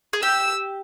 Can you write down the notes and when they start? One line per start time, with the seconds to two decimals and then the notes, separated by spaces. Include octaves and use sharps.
0.13 G#4
0.22 G4 E6